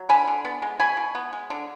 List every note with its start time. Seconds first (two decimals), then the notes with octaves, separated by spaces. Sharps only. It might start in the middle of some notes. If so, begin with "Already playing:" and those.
Already playing: F#3
0.09 D3 G#5 B5
0.27 D3
0.45 B3
0.62 G#3
0.79 B2 G#5 B5
0.97 B2
1.15 B3
1.33 G#3
1.50 D3